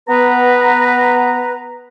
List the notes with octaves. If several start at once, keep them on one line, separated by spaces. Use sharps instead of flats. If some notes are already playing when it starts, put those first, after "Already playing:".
B3 B4 A#5